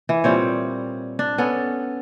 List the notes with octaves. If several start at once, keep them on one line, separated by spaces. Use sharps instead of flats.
E3
A#2 G3 C4 C#5
D4
B3 C#4 A4